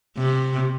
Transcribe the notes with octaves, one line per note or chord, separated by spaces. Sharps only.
C3